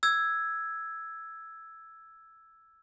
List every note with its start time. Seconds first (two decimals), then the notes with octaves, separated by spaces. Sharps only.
0.03 E6 G#6